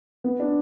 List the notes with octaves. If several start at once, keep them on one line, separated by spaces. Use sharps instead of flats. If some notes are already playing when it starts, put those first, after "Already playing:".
B3
D4